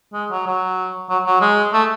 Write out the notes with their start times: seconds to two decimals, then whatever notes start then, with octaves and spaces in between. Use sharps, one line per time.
0.13 G#3
0.31 F#3
0.46 F#3
1.10 F#3
1.26 F#3
1.41 G#3
1.73 A3